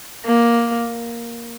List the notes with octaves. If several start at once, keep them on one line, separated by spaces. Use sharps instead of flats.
A#3